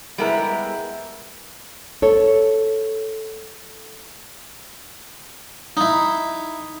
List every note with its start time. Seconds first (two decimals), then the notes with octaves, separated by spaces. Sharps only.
0.18 G3 G#3 B3 E4 A#4
2.02 A4 C#5
5.77 D#4 E4